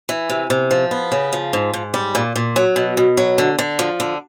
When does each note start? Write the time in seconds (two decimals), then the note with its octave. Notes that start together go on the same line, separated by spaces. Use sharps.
0.09 E3
0.30 C3
0.50 C3
0.71 F3
0.91 B3
1.12 C#3
1.33 F3
1.53 G#2
1.73 G#2
1.94 G3
2.15 A#2
2.36 A#2
2.56 F#3
2.76 B2
2.97 B2
3.17 F#3
3.38 D3
3.59 D3
3.79 F3
4.00 D3